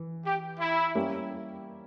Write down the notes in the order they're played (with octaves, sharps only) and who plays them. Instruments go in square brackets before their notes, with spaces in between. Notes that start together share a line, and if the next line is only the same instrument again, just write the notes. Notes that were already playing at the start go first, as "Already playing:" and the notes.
Already playing: [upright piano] E3
[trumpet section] G4
E4
[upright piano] G3 A#3 C#4 E4 G4